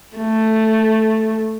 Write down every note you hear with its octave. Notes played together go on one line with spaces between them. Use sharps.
A3